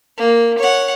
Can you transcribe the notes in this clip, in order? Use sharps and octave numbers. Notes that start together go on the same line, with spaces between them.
A#3
C#5 F#5